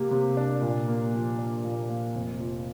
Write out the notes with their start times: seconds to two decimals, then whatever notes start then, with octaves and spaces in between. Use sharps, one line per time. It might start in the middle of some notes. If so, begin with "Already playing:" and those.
Already playing: C3 A#3 G4
0.11 C3
0.37 D4
0.61 A#2
0.88 A#3
1.13 F3
1.38 D4
1.64 A#2
1.89 A#3
2.15 F1
2.40 F3